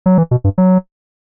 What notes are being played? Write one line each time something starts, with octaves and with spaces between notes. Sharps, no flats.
F#3
E3
B2
G2
F#3